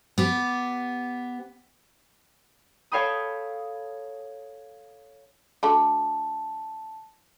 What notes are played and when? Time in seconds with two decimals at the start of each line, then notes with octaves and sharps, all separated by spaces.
0.18 B3 G4
2.92 A4 C#5 F5 G5 B5 D#6
5.63 D3 A3 F#4 A5